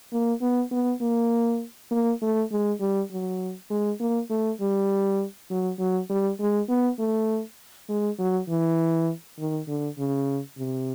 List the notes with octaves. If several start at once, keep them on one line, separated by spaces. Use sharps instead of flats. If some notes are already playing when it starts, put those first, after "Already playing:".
A#3
B3
B3
A#3
A#3
A3
G#3
G3
F#3
G#3
A#3
A3
G3
F#3
F#3
G3
G#3
B3
A3
G#3
F#3
E3
D#3
D3
C#3
C3